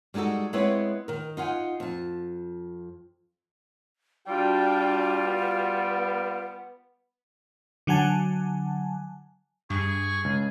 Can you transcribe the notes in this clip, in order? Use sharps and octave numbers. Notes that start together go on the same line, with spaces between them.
G3 G#3 D#4 F#4 A4
G#3 B3 C4 E4 B4 C#5
D#3 A#4
D#4 F4 F#5 G#5
F2 A5
G3 D4 F4 F#4 G5
B3
D3 F#3 F#5 G#5 A5
G2 G#4 C#6
C#2